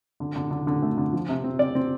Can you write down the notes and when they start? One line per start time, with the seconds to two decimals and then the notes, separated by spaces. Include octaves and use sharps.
0.20 D3
0.36 D3
0.51 D3
0.67 D3
0.82 A3
0.98 D3
1.13 F3
1.29 C3
1.44 C4
1.59 C4 D5
1.75 C4